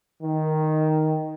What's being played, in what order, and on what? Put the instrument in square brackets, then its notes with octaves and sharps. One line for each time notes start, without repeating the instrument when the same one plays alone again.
[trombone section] D#3